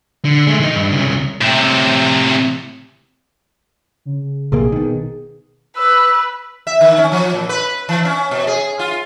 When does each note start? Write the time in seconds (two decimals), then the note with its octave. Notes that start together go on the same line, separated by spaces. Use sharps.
0.25 D3
0.47 G#3 A3
0.60 D#3 D#5
0.76 G2
0.93 C2 C#3
1.41 A2 C3
4.05 C#3
4.52 A#1 C3 A#3 G#4
4.72 B2 D#3
5.77 B4 E6
6.67 E5
6.81 D#3
6.98 C#4
7.12 F3
7.34 A#2
7.49 B4
7.89 E3
8.05 C#4
8.31 B2
8.47 G#4
8.79 F4